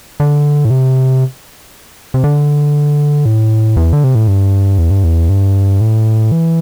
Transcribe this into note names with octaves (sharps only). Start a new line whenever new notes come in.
D3
A2
C3
C3
D3
A2
E2
D3
C3
A2
G2
E2
G2
E2
G2
A2
E3